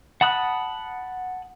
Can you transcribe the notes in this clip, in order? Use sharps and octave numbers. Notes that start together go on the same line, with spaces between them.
F#5 A5 B5 D#6 F#6